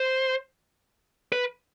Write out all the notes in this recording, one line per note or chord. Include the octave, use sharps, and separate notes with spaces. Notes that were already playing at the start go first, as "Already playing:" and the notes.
Already playing: C5
B4